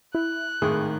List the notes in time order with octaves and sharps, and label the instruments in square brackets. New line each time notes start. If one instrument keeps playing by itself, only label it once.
[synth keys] E4 [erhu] F#6
[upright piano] G#1 A2 D#6 [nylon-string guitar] D#3 [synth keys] G#4